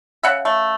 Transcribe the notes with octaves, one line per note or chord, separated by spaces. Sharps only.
C#3 E5 F#5
A3